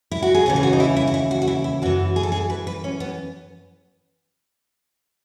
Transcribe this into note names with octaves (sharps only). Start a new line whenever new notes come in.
E4
F#4
G#4
D#2 C#3 E3 A4
G#4
F#4
D#4
E4
E4
F#4
E4
F#4
F#4
E4
E4
F#2 E3 F#4
G#4
A4
G#4
B4
B4
C#4
B3